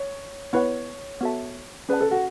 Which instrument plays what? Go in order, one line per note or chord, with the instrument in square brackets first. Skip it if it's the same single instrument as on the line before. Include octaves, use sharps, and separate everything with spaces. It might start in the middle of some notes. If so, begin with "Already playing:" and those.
Already playing: [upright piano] C#5
[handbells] B3 E4 B4 F#5 [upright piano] C#5
[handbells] B3 F#4 A4 E5 A5
[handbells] C#4 G#4 D5 F#5 A5 [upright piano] B4
[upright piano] A4
F#4